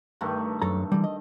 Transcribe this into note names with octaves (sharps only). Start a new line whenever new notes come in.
G2 D#3 A3
F#2 A4 A#5
E3 G3
D#5